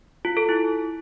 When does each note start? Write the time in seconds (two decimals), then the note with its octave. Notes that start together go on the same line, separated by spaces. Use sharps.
0.25 F4
0.37 A4
0.49 E4